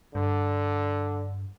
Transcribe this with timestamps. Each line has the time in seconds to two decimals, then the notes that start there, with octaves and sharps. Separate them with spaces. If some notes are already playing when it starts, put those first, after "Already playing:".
0.15 G2 D3